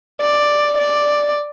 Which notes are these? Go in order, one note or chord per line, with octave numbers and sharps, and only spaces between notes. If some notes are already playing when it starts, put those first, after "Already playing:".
D5
D5